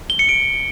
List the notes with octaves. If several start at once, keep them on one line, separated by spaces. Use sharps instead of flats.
G7
C#7
D7